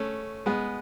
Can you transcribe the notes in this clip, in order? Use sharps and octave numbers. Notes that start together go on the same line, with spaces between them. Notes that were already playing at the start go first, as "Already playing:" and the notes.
Already playing: A3 C#4
G#3 B3